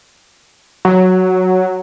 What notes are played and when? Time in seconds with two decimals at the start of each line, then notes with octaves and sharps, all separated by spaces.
0.85 F#3